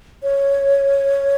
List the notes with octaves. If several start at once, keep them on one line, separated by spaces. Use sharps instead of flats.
C#5